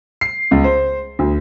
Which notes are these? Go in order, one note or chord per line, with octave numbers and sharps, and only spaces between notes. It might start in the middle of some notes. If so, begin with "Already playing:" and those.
C7
C#2
C5
D2